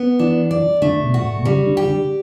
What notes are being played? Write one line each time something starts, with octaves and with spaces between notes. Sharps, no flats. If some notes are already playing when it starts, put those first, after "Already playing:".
Already playing: B3
E3 D4
D5
D3 A3
B2
F#4
A2
B2
C#3 G3
D3
G4
D3